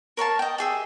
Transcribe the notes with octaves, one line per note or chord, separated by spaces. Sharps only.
A#4 C#5 F5 A5
D#5 G5
G4 G#4 E5